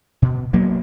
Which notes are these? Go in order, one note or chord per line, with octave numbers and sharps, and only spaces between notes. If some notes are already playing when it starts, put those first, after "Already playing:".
B2
F#3 A#3 B3